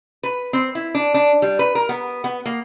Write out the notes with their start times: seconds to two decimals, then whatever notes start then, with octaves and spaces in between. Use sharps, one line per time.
0.23 B4
0.53 C4
0.75 E4
0.95 D4
1.14 D4
1.42 G3
1.59 B4
1.75 A#4
1.89 B3
2.24 B3
2.46 A#3